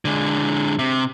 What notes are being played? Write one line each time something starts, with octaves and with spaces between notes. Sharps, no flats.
D3 G#3
C3